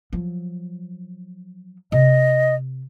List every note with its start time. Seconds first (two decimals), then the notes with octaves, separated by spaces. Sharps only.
0.13 F3 F#3
1.92 C3 D#5